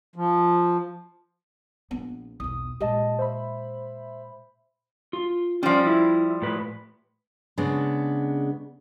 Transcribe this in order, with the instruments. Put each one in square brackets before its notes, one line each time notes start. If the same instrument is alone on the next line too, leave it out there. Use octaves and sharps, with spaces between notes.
[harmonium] F3
[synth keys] A#1 [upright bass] B3
[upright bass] B1 E2 [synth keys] D#6
[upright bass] A#2 G#3 [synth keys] G4 D#5 A5
[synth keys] C5 E5 B5
[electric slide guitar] F4
[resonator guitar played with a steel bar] F3 G3 [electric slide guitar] C#4 D5
[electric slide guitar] E4
A2 B4
[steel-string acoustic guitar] C#3 G#3 B3 D4